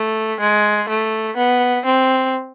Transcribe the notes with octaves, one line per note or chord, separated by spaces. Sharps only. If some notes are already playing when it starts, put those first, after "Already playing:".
Already playing: A3
G#3
A3
B3
C4